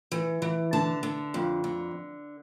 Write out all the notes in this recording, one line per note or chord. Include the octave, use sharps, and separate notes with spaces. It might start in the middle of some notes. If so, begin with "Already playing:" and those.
E3
E3
D3 A5
D3
F2
D3